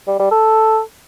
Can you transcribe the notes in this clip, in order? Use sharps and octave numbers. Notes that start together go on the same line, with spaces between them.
G3
G3
A4